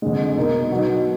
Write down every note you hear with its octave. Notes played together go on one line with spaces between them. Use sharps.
F2 D3 G#3
B2 A#3 D#4 A#4
B2 F#3 B3